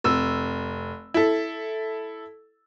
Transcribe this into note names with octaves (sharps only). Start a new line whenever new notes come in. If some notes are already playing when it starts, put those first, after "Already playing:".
F1 E6
E4 A4